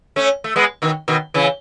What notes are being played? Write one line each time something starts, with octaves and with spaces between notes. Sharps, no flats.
A3 C#4
A3
G#3 B3
B2 D#3
B2 D#3
C#3 E3